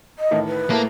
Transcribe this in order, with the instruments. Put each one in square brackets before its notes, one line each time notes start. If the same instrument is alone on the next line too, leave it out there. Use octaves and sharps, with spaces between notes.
[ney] D#5
[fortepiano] A2 D#3 E3
[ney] B4
[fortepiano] A2 A3 [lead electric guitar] A#3